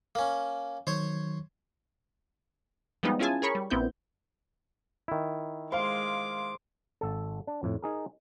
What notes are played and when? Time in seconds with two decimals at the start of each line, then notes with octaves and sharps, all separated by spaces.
0.15 A#3 C#4
0.87 D#3 F#3 C5 C#5
3.03 F3 G3 G#3 B3 D#4
3.19 C#4 E4 F4 G#4 G#5 A5
3.42 G#4 A#4 C#5 B5 C#6
3.55 G3
3.70 A#1 B3 C4 E4 G6
5.08 D#3 E4
5.72 G#3 C5 F5 C6 D6
7.01 G#1 A4
7.47 D4
7.63 F2 A2
7.82 D#4 G#4 A#4